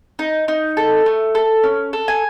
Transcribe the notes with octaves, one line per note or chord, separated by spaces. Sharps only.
D#4
D#4
A4
A3
A4
C#4
A4
G#5